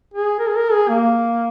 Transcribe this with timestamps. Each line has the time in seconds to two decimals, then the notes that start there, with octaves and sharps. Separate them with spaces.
0.14 G#4
0.39 A#4
0.47 G#4
0.56 A#4
0.72 G#4
0.89 A#3